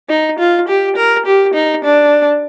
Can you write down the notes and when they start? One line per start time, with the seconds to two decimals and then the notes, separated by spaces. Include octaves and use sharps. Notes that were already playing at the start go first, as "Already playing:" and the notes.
0.09 D#4
0.39 F4
0.68 G4
0.97 A#4
1.26 G4
1.54 D#4
1.84 D4